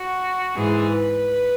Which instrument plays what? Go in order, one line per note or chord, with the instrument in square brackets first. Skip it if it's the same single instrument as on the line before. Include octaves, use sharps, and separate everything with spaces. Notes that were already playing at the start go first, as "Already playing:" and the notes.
Already playing: [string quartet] F#4
G#2 E3 G#4
B4